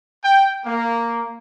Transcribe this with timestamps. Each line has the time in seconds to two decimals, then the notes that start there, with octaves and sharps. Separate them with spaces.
0.24 G5
0.66 A#3